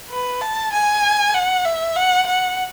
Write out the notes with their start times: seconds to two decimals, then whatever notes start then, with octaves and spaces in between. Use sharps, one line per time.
0.10 B4
0.41 A5
0.73 G#5
1.34 F#5
1.65 E5
1.96 F#5
2.26 F#5